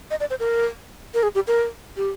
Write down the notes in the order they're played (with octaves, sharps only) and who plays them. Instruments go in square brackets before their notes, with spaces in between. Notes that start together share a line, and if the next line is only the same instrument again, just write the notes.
[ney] D#5
D5
C5
A#4
A#4
G#4
G4
A#4
G4